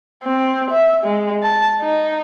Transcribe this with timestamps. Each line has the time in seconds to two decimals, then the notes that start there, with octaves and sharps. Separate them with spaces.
0.23 C4
0.71 E5
1.04 G#3
1.43 A5
1.81 D#4